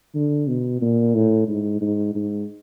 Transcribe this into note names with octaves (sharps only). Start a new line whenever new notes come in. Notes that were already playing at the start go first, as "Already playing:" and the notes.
D3
B2
A#2
A2
G#2
G#2
G#2